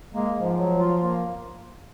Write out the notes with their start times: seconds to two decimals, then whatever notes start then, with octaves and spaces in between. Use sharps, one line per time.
0.14 G#3 A#3
0.35 G#2 F3
0.57 F#3
0.78 F4
1.01 A#3